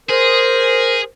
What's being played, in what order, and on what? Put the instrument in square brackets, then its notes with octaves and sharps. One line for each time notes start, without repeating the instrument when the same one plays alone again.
[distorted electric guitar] G#4 [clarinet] A#4 [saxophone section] C5